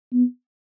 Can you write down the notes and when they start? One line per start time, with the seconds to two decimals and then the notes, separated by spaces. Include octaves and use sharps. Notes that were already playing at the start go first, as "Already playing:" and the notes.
0.13 B3